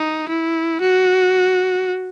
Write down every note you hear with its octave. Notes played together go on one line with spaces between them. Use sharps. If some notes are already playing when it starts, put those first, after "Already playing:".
Already playing: D#4
E4
F#4